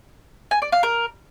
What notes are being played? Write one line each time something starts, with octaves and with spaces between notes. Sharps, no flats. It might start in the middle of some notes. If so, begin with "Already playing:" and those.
G#5
D5
F5
A#4